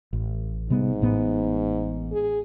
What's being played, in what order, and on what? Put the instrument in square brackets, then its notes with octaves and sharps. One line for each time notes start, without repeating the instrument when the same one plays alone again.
[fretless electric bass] A1
[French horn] G#2 [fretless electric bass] C3 G3 B3
[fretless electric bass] A1 A2 B3
[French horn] G#4